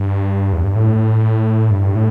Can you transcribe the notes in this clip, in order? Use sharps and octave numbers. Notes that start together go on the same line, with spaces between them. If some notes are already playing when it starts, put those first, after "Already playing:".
Already playing: G2
E2
G2
A2
G2
A2